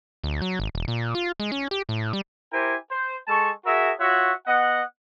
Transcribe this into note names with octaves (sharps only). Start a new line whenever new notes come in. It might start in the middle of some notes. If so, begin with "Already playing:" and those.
D2
F#3
G#1
E1
A#2
F4
G#3
C#4
G4
A2
G3
E4 G4 A#4 C5 G#5
C5
G#3 A4 A5 C#6
F#4 G#4 A#4 E5
F4 F#4 C#5 E5 F#5
B3 D#5 F#5